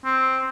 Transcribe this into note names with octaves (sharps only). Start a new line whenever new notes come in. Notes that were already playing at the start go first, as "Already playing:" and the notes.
C4